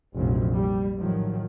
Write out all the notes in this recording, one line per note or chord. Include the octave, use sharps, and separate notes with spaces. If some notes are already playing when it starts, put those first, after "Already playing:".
F1 A#1 A#2 F3 F#3
G3
A2 D#3 F3 F#3